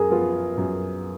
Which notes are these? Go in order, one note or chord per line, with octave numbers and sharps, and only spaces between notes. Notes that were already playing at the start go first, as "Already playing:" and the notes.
Already playing: F#2 G#4 A#4
F3 B3 F4
F#2